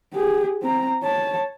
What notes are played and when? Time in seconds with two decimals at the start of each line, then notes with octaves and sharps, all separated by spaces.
0.14 G4 G#4
0.62 C4 A#5
1.03 C#5 A5